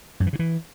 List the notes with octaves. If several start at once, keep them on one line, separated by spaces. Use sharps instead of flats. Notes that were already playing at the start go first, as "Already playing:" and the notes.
F#2
E3
C#3
E3